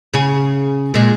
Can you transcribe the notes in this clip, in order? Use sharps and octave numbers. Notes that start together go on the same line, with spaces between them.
C#3 G#4
A#2 G#3